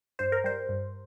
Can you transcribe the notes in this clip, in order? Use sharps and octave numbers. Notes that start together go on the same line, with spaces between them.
G2 C5
A#4
G3 C5
G2